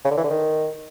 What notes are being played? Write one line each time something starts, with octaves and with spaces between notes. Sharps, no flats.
C#3
D3
E3
D3
D#3